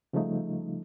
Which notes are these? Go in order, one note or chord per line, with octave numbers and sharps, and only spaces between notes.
C#3 F3 G3 A3 D#4